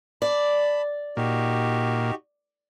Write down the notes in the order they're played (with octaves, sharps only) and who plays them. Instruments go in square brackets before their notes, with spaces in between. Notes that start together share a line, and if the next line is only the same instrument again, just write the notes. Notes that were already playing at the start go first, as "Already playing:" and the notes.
[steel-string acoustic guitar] D5 [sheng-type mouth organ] A5 B5
[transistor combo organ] A#2 [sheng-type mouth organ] D#4 F#4 G4